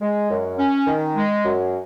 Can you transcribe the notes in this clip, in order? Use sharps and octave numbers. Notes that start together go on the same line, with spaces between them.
G#3
F#2
C#4
D#3
G#3
F#2